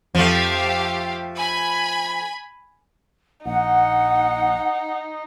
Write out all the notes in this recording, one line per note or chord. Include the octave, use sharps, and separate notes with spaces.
F2 F3 A3 G4 F5
G#5 B5
A#1 D#4 F#5